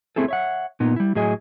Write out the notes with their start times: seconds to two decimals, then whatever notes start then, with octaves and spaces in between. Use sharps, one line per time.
0.16 A3 C4 E4 G#4 A4
0.28 C#5 E5 F#5
0.80 A#2 B3 D#4
0.96 G3 E4
1.15 A2 F#3 G#4 D#5 G#5